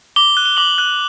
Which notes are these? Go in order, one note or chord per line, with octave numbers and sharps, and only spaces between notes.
D6 G7
F#6
G7
D6 F#7
F#6